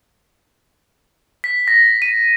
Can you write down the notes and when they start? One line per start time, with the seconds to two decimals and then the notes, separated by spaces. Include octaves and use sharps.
1.44 B6
1.68 A#6
2.02 D#7